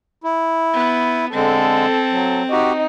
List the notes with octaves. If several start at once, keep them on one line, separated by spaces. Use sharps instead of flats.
E4
B3
D3 G#3 C4 A4
F#3
D#4 F#4 G4